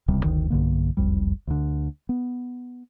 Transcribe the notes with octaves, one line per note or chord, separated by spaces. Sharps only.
D1 C#2 C3 G3
F#1 D2 D#3
B1 G2 D3 A#3
F#1 C2 F2 G3
D2 D3
B3